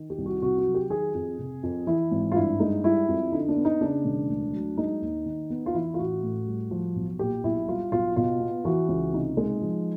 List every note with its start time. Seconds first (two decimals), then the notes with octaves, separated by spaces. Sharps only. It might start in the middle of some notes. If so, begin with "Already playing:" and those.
Already playing: D#3
0.10 G4
0.18 C2
0.26 F#4
0.42 C3 F#4
0.58 F#4
0.66 F#3
0.74 G4
0.90 D#3 G#4
1.14 F2
1.39 C3
1.63 F2
1.87 E3 E4
2.11 G#1
2.32 F4
2.35 G2 E4
2.60 G#3 D#4
2.84 G3 E4
3.08 F2
3.32 D3 D#4
3.49 D4
3.56 B3
3.65 D#4
3.81 C#3 D4
4.05 E1
4.30 D2
4.54 F#3
4.77 G#3 D#4
5.02 D#2
5.26 D#3
5.50 B3
5.66 F4
5.74 E3 E4
5.94 F4
5.99 A1 F#4
6.23 A2
6.47 G3
6.71 F3
6.96 B1
7.19 A#2 G4
7.44 B1 E4
7.68 G3 F4
7.92 B1 F4
8.16 B2 F4
8.40 B3
8.65 E3 F#4
8.89 C#2
9.13 C3 D#4
9.37 G#3
9.62 F3